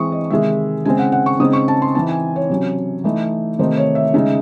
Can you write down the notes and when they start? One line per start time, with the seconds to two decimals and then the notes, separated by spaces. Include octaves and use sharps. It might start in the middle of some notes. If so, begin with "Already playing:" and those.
Already playing: E3 G#3 C4 C#6 D#6
0.12 D#5
0.30 C3 D#3 G#3 E5
0.85 C#3 G#3 C4 G#5
0.99 F#5
1.12 F#5
1.26 C#6
1.40 C#3 G#3 C4 D#4 D#6
1.53 C#6
1.68 A5
1.82 C6
1.94 E3 C4 D#4 A5
2.09 G#5
2.36 C#5
2.50 C3 F#3 C#4
3.04 E3 A3 D#4
3.59 C3 D#3 A3 D#4 C5
3.77 C#5
3.95 E5
4.14 C#3 G#3 D#4 E5